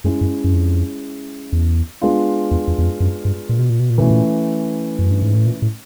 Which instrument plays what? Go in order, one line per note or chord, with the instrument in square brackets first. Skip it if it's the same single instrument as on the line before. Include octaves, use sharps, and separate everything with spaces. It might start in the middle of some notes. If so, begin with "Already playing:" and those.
[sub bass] F#2 [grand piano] G#3 C#4 E4
[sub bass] F#2
F#2
F2
E2
[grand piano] G#3 B3 D4 F4
[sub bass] E2
E2
E2
F2
F#2
G2
A#2
B2
A#2
B2
A#2
[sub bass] B2 [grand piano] E3 A3 C#4
[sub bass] A#2
F#2
G2
G#2
A2
A#2
A2